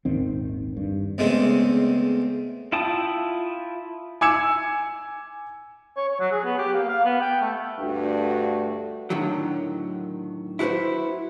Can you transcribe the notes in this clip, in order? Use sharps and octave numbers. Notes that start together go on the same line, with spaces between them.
D#1 G#1 D#3 C4
G2
E2 C#3 G#3 A3 C4
E4 F4 G5 A5 D#6
G#5 D6 E6 G#6 C#7 E7
C#5
C#5
F#3
G#4
B3
G4
A#3
F5
B3
G5
A3
D2 G2 A3 D4 F#4
A2 D3 D#3 F#3
E4 F#4 G4 B4 C5